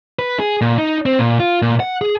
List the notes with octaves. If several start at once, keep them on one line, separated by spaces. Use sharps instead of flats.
B4
G#4
A#2
D#4
C4
A#2
F4
A#2
F#5
G#4